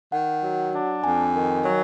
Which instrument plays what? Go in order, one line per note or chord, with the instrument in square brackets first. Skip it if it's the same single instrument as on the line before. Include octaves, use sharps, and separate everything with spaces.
[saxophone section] D#3 [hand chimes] F#5
[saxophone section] F#3
D4
[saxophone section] F2 [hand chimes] G#5
[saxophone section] D#3
F#3